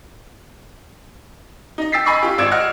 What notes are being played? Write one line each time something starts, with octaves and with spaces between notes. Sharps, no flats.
D#4 D#5
G5 E6 A6 B6 C7
D#5 G#5 B5 C#6 E6 C7
F4 G4
G#1 D5 E6 G#6 D7 E7
D#5 F#5 F6